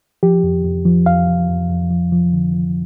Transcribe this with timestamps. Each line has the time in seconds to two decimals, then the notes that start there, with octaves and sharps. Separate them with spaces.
0.23 F3 G4
0.44 F2
0.64 F2
0.85 F3
1.06 F2 F5
1.28 F2
1.49 F2
1.70 F2
1.90 F3
2.12 F3
2.33 D3
2.54 F3